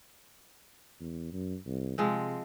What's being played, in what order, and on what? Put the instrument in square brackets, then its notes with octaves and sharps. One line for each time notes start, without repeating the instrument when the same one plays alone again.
[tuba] E2
F#2
C2
[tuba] C3 [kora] F3 G#3 C4